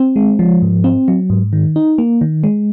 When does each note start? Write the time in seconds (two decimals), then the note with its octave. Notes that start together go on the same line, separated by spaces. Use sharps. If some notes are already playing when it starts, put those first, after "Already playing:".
Already playing: C4
0.16 G#3
0.39 F3
0.62 G#2
0.84 C4
1.08 F#3
1.30 G#2
1.53 D#3
1.76 D#4
1.98 A#3
2.21 D#3
2.44 G#3